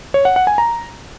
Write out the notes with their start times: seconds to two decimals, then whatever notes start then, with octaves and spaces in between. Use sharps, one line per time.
0.14 C#5
0.25 F#5
0.36 F#5
0.47 G#5
0.58 A#5